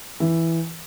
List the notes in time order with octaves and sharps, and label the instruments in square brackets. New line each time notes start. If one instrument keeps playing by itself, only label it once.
[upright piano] E3